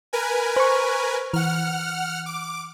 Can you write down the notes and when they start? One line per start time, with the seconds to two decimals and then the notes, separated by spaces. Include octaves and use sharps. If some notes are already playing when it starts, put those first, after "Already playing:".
0.13 A#4 B4 G#5
0.56 C5 C#6
1.34 E3 F#5 F6
2.26 D6